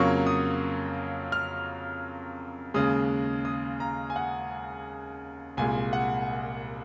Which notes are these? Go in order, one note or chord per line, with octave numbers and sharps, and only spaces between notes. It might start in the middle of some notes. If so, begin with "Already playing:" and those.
Already playing: F2 C#3 F#3 A#3 C#6
D#6
F6
D#2 C#3 G#3 D#6
D#6
A#5
G#5
F#5
C2 A#2 G#3 G#5
F#5